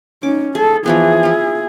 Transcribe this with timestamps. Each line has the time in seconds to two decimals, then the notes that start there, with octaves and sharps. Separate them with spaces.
0.23 C#4 D#4 D6
0.55 G#4 A4
0.86 E3 F3 B3 G#4
1.23 E4 F4